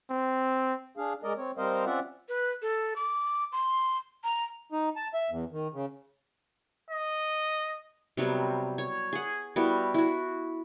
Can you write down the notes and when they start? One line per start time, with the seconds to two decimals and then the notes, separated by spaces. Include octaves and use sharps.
0.10 C4
0.97 D4 G#4 F5
1.24 G#3 A#4 D5 D#5
1.37 C4 C#5
1.58 G3 C4 A#4 C5 D#5 F5
1.86 C4 C#4 F4 D5 E5 F#5
2.29 B4
2.62 A4
2.96 D6
3.52 C6
4.24 A#5
4.72 D#4
4.96 A5
5.14 E5
5.30 E2
5.52 D#3
5.74 C#3
6.90 D#5
8.17 C3 F#3 G3 B3
8.78 C#5
9.13 G#4 F#5
9.56 G3 B3 E4 F#4
9.94 E4 F#4